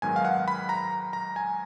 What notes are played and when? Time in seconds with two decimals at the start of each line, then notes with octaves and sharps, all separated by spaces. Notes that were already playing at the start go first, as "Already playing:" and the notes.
0.02 G#2 D#3 F#3 B3 G#5
0.16 F5
0.25 F#5
0.48 B5
0.69 A#5
1.13 A#5
1.36 G#5